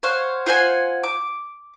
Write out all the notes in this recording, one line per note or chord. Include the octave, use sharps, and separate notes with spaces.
C5 C#5 F5 F#5
F4 C5 F#5 G#5
D6